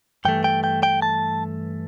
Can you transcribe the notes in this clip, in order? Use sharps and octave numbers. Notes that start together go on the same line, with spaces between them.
G2 E3 A3 G5
G5
G5
G5
A5